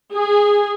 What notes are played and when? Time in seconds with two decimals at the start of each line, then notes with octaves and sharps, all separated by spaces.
0.13 G#4